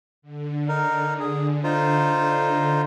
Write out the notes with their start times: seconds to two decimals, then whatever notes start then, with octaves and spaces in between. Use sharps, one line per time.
0.22 D3
0.68 D#4 A#4
1.19 G#4
1.64 D#4 F4 C5